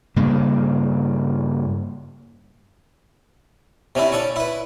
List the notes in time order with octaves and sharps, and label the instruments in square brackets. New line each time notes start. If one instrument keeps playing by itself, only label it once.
[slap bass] G2 C#3 A#3
[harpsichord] C3 C#4 D4 E4
C#4 D4 A4 C#5 G#5
E4 B4